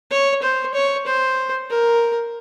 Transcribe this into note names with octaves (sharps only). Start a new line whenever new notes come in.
C#5
C5
C#5
C5
A#4